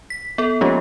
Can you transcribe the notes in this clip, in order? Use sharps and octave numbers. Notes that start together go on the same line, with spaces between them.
B6
B3 A4
F3 G#3 A#3 C#4 F4 G4